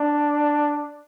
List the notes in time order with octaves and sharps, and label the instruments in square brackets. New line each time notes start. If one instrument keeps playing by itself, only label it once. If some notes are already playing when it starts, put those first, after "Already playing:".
Already playing: [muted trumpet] D4